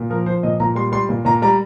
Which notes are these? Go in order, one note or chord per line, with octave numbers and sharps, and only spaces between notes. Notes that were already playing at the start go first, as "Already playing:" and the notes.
Already playing: A#2
F3 A#4
F3 C5
A#2 D#5
A#2 A#5
G3 C6
G3 C6
A#2
A#2 A#5
G3 A#5